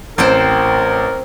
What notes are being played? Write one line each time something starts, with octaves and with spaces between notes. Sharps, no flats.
A1 C4 A#4 C5 G5